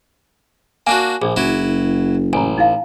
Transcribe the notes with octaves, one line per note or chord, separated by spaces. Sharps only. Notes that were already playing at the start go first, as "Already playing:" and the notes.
A#3 D4 F#4 G#5
A#1 D4 G#4
F#1 F#3 E4
A1 G#5 A#5
D#4 E4 F5